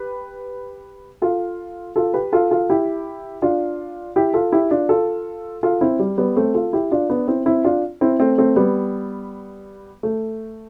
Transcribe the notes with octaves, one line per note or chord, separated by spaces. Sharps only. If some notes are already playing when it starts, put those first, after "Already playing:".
Already playing: G4 B4
F4 A4
F4 A4
G4 B4
F4 A4
F4 A4
E4 G4
D4 F4
E4 G4
F4 A4
E4 G4
D4 F4
F4 A4
F4 A4
C4 E4
G3
G3 B3
A3 C4
F4 A4
E4 G4
D4 F4
B3 D4
C4 E4
C4 E4
D4 F4
C4 E4
A3 C4
A3 C4
G3 B3
A3